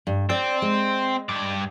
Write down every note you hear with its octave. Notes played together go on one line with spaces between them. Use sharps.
G2
C4 D5
G#3
G2 D5